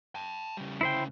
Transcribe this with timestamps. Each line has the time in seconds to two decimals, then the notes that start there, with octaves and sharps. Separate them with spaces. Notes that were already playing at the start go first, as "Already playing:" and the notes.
0.15 G5 A5
0.57 C#3 G3
0.81 D2 C#3 E4 C5 G5